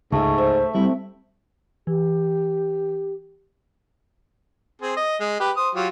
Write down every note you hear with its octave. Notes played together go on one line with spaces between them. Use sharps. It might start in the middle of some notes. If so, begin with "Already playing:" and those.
C#2 G#2 A3
C5 E5
G3 C4 E4
E3 G4
C4 G#4
D#5
G#3
G4 B4
C5 D#6
F#3 F4 G4